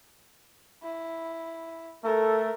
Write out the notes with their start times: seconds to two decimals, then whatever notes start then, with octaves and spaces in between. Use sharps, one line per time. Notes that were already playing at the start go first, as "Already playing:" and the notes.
0.83 E4
2.04 A3 A4 A#4